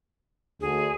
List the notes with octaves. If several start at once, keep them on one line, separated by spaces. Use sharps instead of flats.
D2 G#4